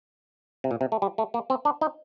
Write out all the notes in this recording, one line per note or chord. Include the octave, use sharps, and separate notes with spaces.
C3
A#2
C3
A3
G3
A3
A#3
C4
D4
D#4